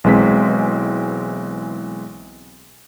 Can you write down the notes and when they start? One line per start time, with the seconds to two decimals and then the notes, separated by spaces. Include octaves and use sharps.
0.04 B1 E3 G#3 C4 B6